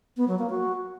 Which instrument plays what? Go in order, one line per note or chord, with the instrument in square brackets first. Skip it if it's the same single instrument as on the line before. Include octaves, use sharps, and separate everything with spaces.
[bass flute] B3
F#3
A#3
F#4